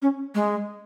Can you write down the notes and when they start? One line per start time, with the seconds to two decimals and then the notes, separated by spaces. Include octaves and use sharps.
0.02 C#4
0.35 G#3